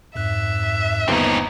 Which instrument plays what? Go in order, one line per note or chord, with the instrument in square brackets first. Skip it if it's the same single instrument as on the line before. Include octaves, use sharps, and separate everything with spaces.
[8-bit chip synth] F2 G#2 F#6 [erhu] E5
[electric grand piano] G1 D#2 B3 [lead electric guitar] C4 D#4